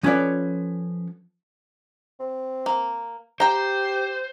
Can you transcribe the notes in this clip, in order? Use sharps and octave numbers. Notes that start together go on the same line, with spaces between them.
F3 C#4 A4 B4 C#5 D5
C4
A#3
G4 C5 G5 A#5